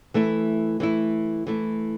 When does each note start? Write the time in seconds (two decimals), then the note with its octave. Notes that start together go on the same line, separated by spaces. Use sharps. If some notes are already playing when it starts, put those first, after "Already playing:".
0.14 E3 A3 E4
0.80 E3 A3 E4
1.47 E3 A3 E4